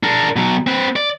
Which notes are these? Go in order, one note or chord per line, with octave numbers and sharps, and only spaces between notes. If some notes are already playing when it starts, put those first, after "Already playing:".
D4 A#4
B2 F#3
C4 B4
D5